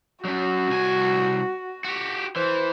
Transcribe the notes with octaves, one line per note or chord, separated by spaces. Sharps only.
F#3 C#4 F#4
C2 G#5
F#4 G4
E3 C5